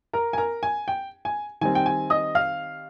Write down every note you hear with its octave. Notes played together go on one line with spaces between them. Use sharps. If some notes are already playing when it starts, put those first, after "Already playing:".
A#4 A#5
G#5
A#4 A#5
G#5
G5
G#5
D#3 G3 C4 G#5
G5
G#5
D#5 D#6
F5 F6